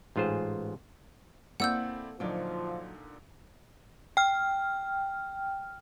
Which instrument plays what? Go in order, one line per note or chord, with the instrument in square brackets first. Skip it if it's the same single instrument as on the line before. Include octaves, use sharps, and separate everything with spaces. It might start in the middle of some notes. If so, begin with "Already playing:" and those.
[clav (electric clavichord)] A1 G#2 F4 G#4 C5
[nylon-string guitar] A#3 A4 [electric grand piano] C4 E4 D5 [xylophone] F#5 E6 G6
[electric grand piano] A#2 D3 D#4 [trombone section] F3 [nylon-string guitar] F#3 F4 D5
[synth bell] G5 F6